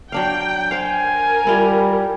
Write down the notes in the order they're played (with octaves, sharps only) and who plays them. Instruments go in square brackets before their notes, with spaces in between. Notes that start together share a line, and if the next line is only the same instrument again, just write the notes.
[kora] F#3 D4 F5 [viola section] G5
[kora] C5 F5 [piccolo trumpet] G#5
[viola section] A#4
[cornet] G3 [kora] E4 F4